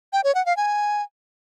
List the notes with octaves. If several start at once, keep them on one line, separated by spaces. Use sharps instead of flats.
G5
C#5
F#5
F5
G#5